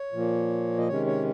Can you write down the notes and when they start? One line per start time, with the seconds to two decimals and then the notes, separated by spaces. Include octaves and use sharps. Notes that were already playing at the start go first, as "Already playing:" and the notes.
Already playing: C#5
0.12 A#2 F3 A#3
0.78 D#5
0.88 C3 D#3 G#3 C#4 C#5
1.06 C#5